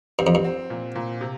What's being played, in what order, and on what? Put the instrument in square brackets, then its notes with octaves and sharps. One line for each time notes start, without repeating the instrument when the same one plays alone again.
[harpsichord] G2 [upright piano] C4
[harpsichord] F2
G2
[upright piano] C4
A#2
A#2
C3